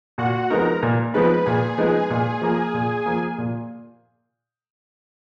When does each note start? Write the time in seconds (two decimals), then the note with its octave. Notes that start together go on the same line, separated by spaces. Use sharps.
0.18 A#2 F#4 F#5
0.50 F3 G#3 B3 D#4 A#4 A#5
0.83 A#2
1.14 F3 G#3 B3 D#4 B4 B5
1.46 A#2 G#4 G#5
1.78 F3 G#3 B3 D#4
2.10 A#2
2.41 F3 A#3
2.74 A#2
3.06 F3 A#3
3.38 A#2